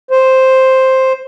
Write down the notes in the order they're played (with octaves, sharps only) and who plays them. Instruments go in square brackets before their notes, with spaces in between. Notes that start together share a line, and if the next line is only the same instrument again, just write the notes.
[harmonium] C5